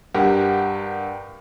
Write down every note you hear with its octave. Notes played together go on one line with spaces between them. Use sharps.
G2 G4 A#4 F#5